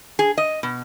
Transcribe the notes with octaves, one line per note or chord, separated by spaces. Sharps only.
G#4
D#5
B2